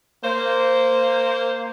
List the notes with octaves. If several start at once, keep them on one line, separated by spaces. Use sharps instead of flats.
A#3 C5